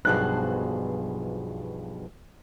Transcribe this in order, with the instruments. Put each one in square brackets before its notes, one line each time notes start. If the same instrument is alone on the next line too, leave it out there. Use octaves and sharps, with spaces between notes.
[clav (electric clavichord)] B1 G2 B2 [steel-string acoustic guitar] F3 G#4 C5 [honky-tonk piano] F#6